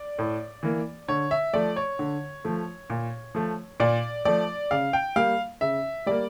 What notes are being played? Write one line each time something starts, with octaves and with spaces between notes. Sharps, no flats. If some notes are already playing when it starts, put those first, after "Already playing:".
Already playing: D5
A2
E3 A#3
D3 C#5
E5
F3 A3 D5
C#5
D3
F3 A3
A#2
F3 A3
A#2 D5
F3 A3 D5
C#3 F5
G5
G3 A#3 F5
C#3 E5
G3 A#3 D5